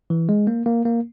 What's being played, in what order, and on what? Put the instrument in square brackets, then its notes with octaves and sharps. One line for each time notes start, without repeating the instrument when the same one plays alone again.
[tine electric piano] E3
G#3
A#3
A#3
A#3